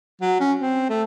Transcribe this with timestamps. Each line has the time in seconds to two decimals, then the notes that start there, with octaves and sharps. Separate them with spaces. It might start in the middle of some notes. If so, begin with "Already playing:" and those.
0.22 F#3
0.40 C#4
0.60 C4
0.90 A3